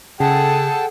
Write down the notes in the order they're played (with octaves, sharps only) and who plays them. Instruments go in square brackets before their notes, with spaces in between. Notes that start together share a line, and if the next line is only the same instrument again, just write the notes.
[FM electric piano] C#3 [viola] G#4 [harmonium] A4 F#5 G5 [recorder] A5